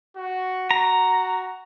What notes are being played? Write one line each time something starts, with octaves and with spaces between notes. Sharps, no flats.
F#4
F#4 A#5